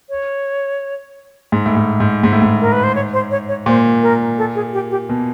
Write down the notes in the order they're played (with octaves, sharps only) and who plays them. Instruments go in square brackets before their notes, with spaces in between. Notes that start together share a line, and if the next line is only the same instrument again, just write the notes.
[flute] C#5
[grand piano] G#2
A2
G#2
G#2
G#2
A2
G#2
[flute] A#4
B4
C5
C#5
C5
C#5
C#5
[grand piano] A#2 [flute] C5
[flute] A#4
A4
G#4
G4
G4
[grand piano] B2